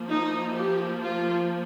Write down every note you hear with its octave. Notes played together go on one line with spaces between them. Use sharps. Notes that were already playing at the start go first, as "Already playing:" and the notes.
Already playing: F3 A#3
D#4
G4
F4